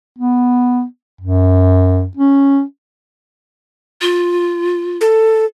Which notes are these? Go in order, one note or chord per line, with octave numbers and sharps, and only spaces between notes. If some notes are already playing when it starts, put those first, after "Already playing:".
B3
F#2
C#4
F4
A4